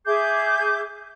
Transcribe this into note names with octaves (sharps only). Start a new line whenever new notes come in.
G#4 E5 D6 G6